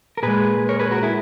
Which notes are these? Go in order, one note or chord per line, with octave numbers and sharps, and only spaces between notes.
A#4
A#2 G#3 G#4 B4
A#4 C#5
G#4 B4
F#4 A#4
E4 G#4